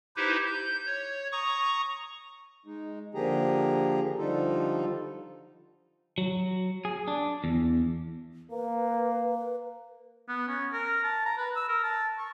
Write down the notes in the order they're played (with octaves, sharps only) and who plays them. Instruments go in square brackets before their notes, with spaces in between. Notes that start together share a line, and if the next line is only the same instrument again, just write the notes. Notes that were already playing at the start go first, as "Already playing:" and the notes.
[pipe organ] D#4 E4 G4 B4 C5
G6
C#5
A#5 C#6 D#6
[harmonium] G#3 D#4
D3 F3 A#3 G4 G#4 A#5
D3 F3 G3 D#4 F4 A4
[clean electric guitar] F#3
G#4
D4
E2
[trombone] A#3 [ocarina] B4
[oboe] B3
C#4
A#4
A5
A#5
B4
E6
A#4
A5
C#6